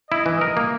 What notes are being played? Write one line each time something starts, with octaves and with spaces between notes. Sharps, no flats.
E4 D#5
E3
A#4
A#3